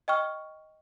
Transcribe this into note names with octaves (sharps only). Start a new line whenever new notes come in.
D#5 G5 C#6 F6